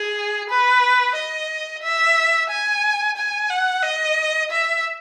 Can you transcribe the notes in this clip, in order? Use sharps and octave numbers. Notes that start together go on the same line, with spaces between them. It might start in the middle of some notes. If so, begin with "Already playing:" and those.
Already playing: G#4
B4
D#5
E5
G#5
G#5
F#5
D#5
E5